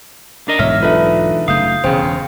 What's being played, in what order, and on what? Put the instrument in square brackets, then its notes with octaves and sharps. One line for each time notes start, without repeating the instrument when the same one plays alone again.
[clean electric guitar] D4 A#4 D#5
[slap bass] B1 G#2 F#3 [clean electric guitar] E2 [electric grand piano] C#5 E5 [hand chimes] F6
[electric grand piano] D4 D#4 B4 [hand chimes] F4 A4 E5
[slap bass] F#1 C#3 A3 [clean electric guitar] F5 [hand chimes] D#6 G6
[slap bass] E1 [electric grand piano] C#2 C#3 [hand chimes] C5 G5